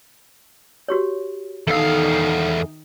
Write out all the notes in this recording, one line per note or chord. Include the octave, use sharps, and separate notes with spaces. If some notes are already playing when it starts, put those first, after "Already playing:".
F#4 G4 C#5
E2 D#3 D#4 A4 F5